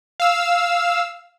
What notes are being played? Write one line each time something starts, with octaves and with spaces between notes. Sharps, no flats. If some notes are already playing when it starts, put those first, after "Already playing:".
F5 E6